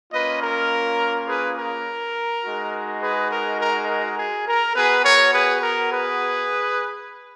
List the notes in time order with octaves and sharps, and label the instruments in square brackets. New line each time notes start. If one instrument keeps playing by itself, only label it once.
[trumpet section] A#3 C#4 F4 B4 D#5
A#4
G#4 B4
A#4
G#3 D#4 F#4
G#4 B4
A#4
A#4
A#4
G#4
A#4
B3 F#4 G#4 B4
A#4 C#5
G#4 B4
A#4
G#4 B4